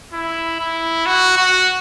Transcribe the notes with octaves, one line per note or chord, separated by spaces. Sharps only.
E4
E4
F#4
F#4